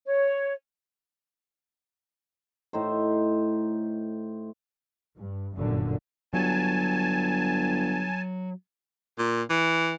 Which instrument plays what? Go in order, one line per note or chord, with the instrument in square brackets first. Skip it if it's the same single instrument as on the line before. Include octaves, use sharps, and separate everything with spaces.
[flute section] C#5
[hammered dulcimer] A2 D#4 C5
[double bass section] G2
G1 F#2 A#2 D3
[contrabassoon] G1 [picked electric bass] F#3 [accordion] G#5 A5
[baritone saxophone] A#2
E3